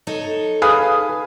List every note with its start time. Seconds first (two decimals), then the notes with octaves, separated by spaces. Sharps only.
0.07 D#4 A4 C#5
0.62 G#4 B4 F5 D#6